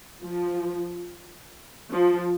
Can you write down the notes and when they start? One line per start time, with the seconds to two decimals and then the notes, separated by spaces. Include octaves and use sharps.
0.23 F3
1.92 F3